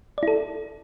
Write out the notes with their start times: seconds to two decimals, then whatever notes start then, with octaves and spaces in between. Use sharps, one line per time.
0.18 D5
0.23 E4
0.28 A4